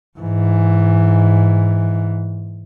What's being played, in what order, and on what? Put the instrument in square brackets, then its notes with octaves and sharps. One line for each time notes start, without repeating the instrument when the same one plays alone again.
[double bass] G#2 E3